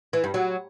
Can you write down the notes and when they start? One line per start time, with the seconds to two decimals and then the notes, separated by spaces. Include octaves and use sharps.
0.13 E3
0.24 G2
0.34 F#3